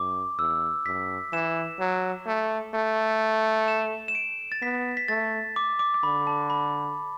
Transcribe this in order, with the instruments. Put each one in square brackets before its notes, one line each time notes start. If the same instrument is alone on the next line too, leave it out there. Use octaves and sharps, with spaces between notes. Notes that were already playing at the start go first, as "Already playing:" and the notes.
Already playing: [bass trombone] F#2 [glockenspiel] D6
[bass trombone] E2 [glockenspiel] E6
[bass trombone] F#2 [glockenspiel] B6
[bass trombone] E3 [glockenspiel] E7
[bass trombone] F#3
A3
A3
[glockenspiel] E7
E7
D7
A6
[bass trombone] B3 [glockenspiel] B6
[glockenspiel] B6
[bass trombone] A3 [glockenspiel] A6
[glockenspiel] D6
D6
D6
[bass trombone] D3 [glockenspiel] B5
[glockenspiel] A5
B5